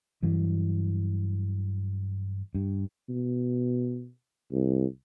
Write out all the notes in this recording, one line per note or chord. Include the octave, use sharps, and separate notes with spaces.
G2 E3 F#3
G2
B2
C2